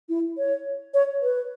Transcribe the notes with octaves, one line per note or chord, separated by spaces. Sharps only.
E4
C#5
C#5
B4